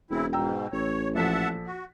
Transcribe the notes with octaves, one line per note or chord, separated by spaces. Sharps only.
E1 C#3 C4 E4
G#2 B2 G5 A#5 E6
A1 C#5
A#1 A4 E5 F#5 A5 B6
F#4